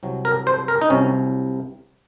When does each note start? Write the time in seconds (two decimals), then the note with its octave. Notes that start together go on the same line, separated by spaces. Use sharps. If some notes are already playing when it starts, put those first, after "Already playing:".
0.03 C2 C3 F#3
0.25 A#4
0.47 C5
0.68 A#4
0.81 D#4
0.90 C2 C3 F#3 C#4